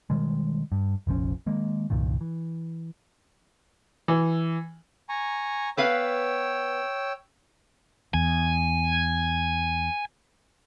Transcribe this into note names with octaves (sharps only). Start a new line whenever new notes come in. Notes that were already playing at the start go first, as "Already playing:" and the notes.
B2 D#3 G3 G#3
G2
F1 A#1 F3 C#4
D#3 G#3 A#3
C2 G2 A#2 D#3
E3
E3
G#5 A#5 C#6
B3 B4 C#5 F5 G5 E6
E2 G#5